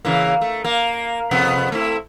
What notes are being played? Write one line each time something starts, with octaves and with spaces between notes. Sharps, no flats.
C#3 E3 A#3
A3
A#3
F2 C3 B3
A3 C4 E4